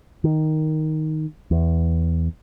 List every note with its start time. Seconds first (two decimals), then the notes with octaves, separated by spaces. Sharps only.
0.24 D#3
1.51 E2